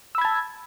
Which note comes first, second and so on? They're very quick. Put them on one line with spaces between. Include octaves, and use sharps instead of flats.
E6 B5 G#6 A5